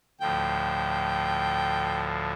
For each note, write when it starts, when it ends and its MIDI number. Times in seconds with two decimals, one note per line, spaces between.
0.21 2.33 38
0.21 2.33 45
0.21 2.33 53
0.21 2.11 79